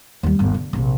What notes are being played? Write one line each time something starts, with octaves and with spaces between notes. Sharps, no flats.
D#2 G3
G1 D#2
D3
A#1 C3